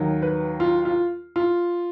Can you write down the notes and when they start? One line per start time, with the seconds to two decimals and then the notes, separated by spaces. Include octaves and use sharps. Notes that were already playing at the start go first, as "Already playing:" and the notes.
Already playing: D#2 D#3 F#3
0.22 B4
0.60 F4
0.85 F4
1.36 F4